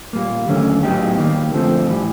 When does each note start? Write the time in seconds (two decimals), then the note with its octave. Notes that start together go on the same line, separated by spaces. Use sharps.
0.13 A#2 G3 A#3
0.48 D#2 D3 F#3 A3 C#4
0.83 A2 F#3 B3 D#4 G4
1.18 D#3 G3 A#3
1.52 F2 D3 F3 A3 C4
1.87 A2 E3 G3